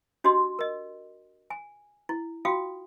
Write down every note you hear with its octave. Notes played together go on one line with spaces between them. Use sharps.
D4 F#4 G4 D#5 C6
A#4 D#5
G#5
E4
F4 F#4 F5 G5 D#6